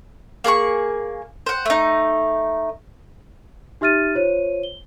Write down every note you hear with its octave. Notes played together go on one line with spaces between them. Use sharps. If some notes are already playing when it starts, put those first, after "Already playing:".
A#3 G#4 A5 C#6
C5 F#5
A3 D#4
D#4 G4 E5 F6 A6 D#7
F4 C5 C#5 D#7
G7